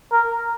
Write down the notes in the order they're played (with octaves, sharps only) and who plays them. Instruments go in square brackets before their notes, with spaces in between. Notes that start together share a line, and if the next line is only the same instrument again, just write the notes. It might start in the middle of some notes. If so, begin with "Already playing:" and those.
[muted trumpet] A#4